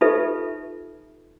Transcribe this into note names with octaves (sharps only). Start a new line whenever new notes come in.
D#4 F4 G4 A4 B4 E5